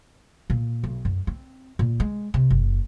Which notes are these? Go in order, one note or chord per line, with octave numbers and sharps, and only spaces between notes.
A#2
B1
F#2
C4
A#2
G#3
C3
F#1